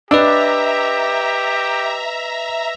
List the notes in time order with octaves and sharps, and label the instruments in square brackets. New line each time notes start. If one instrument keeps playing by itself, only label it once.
[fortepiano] D4 [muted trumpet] G4 [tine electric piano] B4 D#5 E6 [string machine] E5 A#5